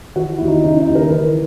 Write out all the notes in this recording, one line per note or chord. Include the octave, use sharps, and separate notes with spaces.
E3 F#4
D#2 E4
D#4
C#3 D#4
E4
D#4
D#2
A#4
E3 B4